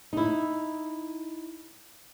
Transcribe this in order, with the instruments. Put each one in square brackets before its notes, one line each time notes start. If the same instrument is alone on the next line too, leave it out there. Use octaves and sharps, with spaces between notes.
[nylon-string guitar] D#4 E4